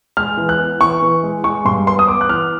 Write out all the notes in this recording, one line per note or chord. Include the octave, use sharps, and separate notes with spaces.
G#3 F6
E3
F#6
B3
E3 C#6
E3
G#3
G#3 C#6
G2 C6
B3 C6
D#6
B3 D6
F#6
E3 F6